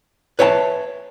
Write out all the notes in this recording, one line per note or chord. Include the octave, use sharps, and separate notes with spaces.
B4 C#5 E5 G5 A5